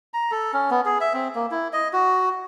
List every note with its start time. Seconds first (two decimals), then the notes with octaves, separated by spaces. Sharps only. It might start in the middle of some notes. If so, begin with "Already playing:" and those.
0.14 A#5
0.31 A4
0.53 C#4
0.71 B3
0.85 G#4
1.00 E5
1.14 C4
1.35 A#3
1.51 E4
1.73 D#5
1.93 F#4